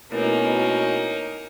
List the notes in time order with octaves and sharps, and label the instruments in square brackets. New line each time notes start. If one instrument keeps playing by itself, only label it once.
[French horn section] B2 [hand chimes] A3 E4 A#4 [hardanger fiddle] A#3 D#4 [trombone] C#4